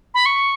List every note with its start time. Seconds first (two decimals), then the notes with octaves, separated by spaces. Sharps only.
0.14 B5
0.26 C#6